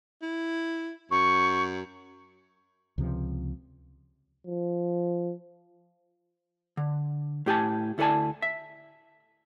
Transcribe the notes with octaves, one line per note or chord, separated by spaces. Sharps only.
E4
F#2 C#6
C#2 C3 F3
F3
D3
A2 G4 G#5 A5
D2 E4 A4 D5 G#5 A5
E5